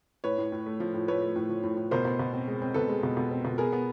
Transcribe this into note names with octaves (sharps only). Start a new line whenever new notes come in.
A2 B4 C#5
A2
A2
A3
F3
A2
A3 B4 C#5
A3
A2
F3
A2
A2
B2 A#4 C5
B2
B2
C4
G#3
C4
B2 A4 B4
G#3
B2
B2
C4
B2
B3 G#4 A#4
B3